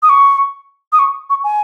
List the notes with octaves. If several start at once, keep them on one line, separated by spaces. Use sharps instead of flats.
D#6
C#6
D#6
C#6
C#6
G#5